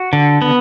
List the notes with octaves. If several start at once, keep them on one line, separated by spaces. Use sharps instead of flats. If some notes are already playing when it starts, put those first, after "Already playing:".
Already playing: F#4
D3
B3